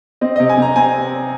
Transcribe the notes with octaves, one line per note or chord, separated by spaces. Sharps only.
C4 D#5
C3 D#5
G#5
C3 A#5
C4 G#5